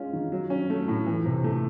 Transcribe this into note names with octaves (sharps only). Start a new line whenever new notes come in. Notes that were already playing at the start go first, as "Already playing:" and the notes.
Already playing: G#3 C#4 F4
D#3
F#3
C#4
A3
A2
E3
C3
A3